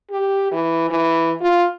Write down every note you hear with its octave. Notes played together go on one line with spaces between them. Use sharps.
G4
E3
E3
F4